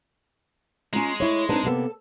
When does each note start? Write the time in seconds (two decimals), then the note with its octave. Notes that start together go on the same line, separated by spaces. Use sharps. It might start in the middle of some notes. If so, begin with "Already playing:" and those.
0.93 G#3 C#4 F4 A#5
1.20 A3 E4 C#5
1.49 C4 D4 D#4 B4 A5
1.64 C3 A#3 B3 A4 A5